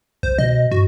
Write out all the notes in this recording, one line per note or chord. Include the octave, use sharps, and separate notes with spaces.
C2 C5
B2 D#5
G2 F#4